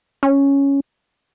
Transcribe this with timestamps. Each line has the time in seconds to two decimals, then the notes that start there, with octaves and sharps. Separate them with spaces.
0.23 C#4